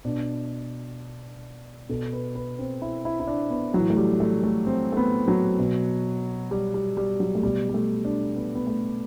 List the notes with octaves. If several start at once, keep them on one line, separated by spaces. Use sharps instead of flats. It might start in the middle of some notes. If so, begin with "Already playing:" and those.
B2 D4
B2 A4
B4
B4
C4
E4
E4
E4
D4
B3
A2 E3 F#3
A3
G3
A3
A3
C4
A3
B3
F#3
B2
G3
G3
G3
F#3
A3
B2 G3
G3
A3
D4
B3
B3
A3